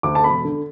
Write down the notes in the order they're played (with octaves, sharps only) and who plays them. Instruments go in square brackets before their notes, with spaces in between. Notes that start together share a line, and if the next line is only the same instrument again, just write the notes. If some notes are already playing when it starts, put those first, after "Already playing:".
[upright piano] D2 D6
A5
E1 B5
D3